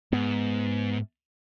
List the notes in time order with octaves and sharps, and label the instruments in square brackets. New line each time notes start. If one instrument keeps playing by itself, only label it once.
[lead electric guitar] G#2 [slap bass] B3